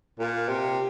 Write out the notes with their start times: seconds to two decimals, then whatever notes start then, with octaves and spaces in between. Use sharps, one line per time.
0.19 A#2
0.48 C3